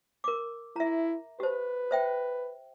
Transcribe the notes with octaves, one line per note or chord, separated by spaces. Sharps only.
A#4 D6
E4 E5 A#5
G4 B4 C5
C5 E5 G5